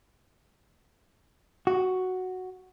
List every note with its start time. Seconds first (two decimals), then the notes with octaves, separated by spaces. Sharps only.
1.67 F#4